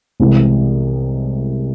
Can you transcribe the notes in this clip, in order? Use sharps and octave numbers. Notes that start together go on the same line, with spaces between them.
C2 C3 E3 G#3